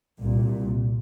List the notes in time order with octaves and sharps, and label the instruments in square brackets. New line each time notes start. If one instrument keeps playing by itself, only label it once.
[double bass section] C2 A#2